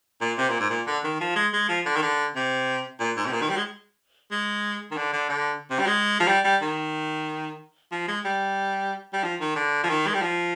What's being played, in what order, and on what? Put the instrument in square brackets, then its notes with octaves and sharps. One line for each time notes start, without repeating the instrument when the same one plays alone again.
[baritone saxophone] A#2
C3
A#2
G#2
A#2
D3
D#3
F3
G#3
G#3
F3
D3
D#3
D3
C3
A#2
G#2
C3
A#2
D#3
G3
G#3
G#3
D#3
D3
D3
D3
C3
G3
G#3
F3
G3
G3
D#3
F3
G#3
G3
G3
F3
D#3
D3
F3
D#3
G#3
G3
F3